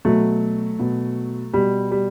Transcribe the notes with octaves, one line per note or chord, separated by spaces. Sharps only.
B2 F#3 A3
B2
B2 G3
G3